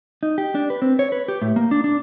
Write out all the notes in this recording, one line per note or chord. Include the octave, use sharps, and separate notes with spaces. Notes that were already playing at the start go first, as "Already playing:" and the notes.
D#4
G4
D4
B4
C4
C#5
B4
G4
A2
A#3
D4
D4